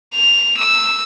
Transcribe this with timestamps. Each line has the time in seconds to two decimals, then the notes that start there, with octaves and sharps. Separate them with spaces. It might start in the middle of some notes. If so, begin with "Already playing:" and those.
0.14 F7
0.57 E6